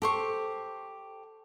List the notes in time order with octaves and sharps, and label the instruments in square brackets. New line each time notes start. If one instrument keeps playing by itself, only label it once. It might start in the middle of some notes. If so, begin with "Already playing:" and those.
[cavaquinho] G4 C5 C#6 [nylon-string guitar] A4